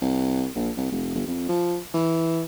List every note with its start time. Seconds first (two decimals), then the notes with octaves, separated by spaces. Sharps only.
0.01 C2
0.56 A#1
0.77 C2
0.92 F1
1.15 G1
1.27 F2
1.49 F3
1.94 E3